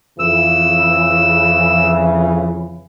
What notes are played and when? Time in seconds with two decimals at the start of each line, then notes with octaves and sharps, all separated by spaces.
0.19 F2 C#3 E3 E6